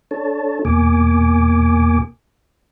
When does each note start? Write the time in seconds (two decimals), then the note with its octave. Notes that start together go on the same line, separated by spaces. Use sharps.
0.11 D4 A4 C#5 A5
0.65 E2 B2 A#3 G#5 D6